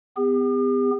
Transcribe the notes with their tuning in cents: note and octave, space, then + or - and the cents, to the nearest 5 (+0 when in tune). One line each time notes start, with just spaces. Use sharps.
B3 +35 G4 +45